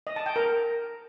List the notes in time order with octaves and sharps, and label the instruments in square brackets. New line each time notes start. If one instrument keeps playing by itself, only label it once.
[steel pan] D#5
A5
G5
A#4